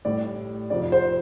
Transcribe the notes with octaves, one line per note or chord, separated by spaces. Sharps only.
A2 G3 D5
F2 C3 F3 D5
C5